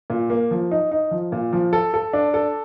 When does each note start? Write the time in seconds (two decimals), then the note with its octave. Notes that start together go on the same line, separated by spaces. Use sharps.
0.10 A#2
0.30 A#3
0.51 F3
0.71 D#4
0.91 D#4
1.11 F3
1.32 A#2
1.53 F3
1.73 A4
1.94 A4
2.13 D4
2.34 A4